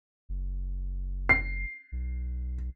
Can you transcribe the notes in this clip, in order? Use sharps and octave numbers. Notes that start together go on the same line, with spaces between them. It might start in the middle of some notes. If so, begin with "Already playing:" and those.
F#1
C7
B1